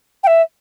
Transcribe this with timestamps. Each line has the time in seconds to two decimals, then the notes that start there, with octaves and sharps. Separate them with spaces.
0.23 G5
0.27 E5